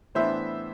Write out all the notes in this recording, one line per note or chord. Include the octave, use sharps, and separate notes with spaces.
A2 E3 B3 D4 C5 E5